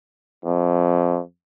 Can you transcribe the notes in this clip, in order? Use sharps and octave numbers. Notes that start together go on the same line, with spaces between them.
F2